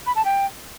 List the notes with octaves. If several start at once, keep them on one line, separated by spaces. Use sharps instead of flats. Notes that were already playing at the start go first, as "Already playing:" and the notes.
B5
A5
G5